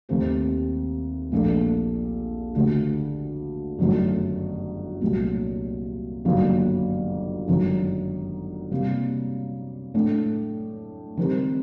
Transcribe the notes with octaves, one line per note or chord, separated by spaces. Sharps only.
D#2 D#3 A3 C4 G4
A#1 A#2 A3 D4 A4
D2 D3 A3 D4 G4
G1 F#2 D#3 A3
C2 A#2 F#3 A3
G1 F#2 D#3 F#3 A#3
G1 F#2 D#3
C3 G3 A#3
A2 A3 D4 A4
D#3 G3 C4 G4 A#4